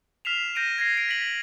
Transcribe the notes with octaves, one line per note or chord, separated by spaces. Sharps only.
F6 B6 C7 E7 F7
G6 A#6 D7 D#7
G#6 A#6 C7
A#6 D7
B6 F#7